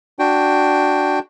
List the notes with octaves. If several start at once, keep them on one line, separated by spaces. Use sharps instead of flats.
D4 F#4 G5